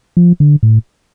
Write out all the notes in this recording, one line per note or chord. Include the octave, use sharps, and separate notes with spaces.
F3
D3
A2